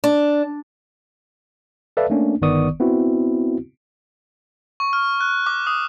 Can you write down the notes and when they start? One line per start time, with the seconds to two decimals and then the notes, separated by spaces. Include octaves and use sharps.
0.04 D4
1.97 A4 B4 D5 E5 F5 A5
2.10 A3 A#3 C#4 D4
2.42 G1 D#3 B3 D5 C#6 D#6
2.80 B3 C4 E4 F#4
4.80 C#6
4.93 F6
5.21 F#6
5.46 D6
5.67 D#6